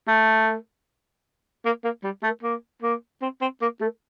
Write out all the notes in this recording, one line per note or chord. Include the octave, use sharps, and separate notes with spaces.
A3
A#3
A#3
G3
A3
A#3
A#3
C4
C4
A#3
A3